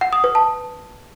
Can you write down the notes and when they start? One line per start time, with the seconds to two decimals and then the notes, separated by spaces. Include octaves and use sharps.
0.01 F#5
0.13 D#6
0.24 B4
0.35 A5